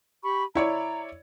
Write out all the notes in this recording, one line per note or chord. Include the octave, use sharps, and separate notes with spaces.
G4 B5 C#6
E4 C#5 D5 A#5